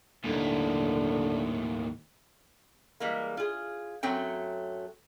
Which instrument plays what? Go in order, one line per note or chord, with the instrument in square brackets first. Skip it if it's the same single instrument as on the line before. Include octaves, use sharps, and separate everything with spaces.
[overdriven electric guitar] D#2 A2 [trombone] D3
[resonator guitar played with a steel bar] E3 G3 G#3 A#3
F4 G#4
F#2 F#3 A3 C4 F#4 G5